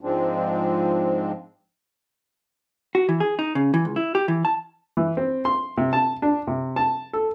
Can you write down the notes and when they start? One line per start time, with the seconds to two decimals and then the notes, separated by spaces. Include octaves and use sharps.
0.01 G#2 F3 G#3 C4 D4
2.95 F#4
3.09 E3
3.20 G#4
3.39 D#4
3.55 C#3
3.74 E3
3.85 C#2
3.96 E4
4.15 G4
4.28 E3
4.45 A5
4.97 E3
5.17 C4
5.45 C6
5.77 C3
5.93 A5
6.22 D4
6.47 C3
6.76 A5
7.13 A4